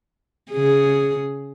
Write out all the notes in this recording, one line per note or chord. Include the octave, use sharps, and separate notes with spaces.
C#3 G#4